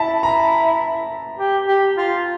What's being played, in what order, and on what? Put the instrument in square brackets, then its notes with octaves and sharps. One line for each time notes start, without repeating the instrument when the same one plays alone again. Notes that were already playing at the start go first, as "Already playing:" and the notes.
Already playing: [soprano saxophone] E4 [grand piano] A5
[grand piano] A#5
[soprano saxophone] G4
G4
F4